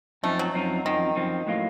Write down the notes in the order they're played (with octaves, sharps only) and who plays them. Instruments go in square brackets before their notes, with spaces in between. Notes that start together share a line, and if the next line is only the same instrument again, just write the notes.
[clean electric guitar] F#2 F3 C4 D#4 [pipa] A3
[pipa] F#3
[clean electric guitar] F#2 F3 C4 D#4
[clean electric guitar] F#2 F3 C4 D#4 [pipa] D#3
[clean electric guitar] F#2 F3 C4 D#4
A2 F#3 A#3 F4